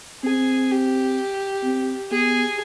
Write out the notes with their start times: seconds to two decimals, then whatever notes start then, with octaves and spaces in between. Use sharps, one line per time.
0.24 C4 G#4
0.71 G4
1.64 C4
2.11 B3 G#4